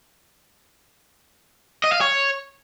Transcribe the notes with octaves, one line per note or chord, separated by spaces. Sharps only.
D#5
F5
C#5